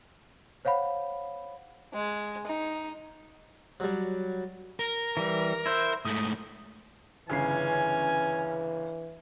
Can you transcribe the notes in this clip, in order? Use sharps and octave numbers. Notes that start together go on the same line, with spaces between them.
C5 C#5 F5 F#5 B5
G#3
D#4
F#3 G3
A#4
E3 G3
E4 C5
G#2 A3 D#6
G1 C#3 E3 C#4 G#5 C7